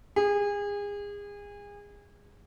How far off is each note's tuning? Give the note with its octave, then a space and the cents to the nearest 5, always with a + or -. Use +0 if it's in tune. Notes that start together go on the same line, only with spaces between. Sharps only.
G#4 -30